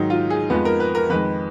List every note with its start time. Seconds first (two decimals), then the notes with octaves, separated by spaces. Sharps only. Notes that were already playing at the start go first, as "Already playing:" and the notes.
Already playing: G#2 D#3 F#3 D#4
0.10 F4
0.30 G#4
0.50 F2 F3 G#3 B3
0.65 A#4
0.80 B4
0.95 A#4
1.09 F2 D#3 G#3 B4